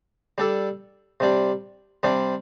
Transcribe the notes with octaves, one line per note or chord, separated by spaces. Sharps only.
G3 D4 A4
C3 G3 D4
C3 G3 D4